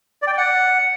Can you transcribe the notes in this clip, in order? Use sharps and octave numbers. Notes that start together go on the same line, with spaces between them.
D5
G5
D5
F#5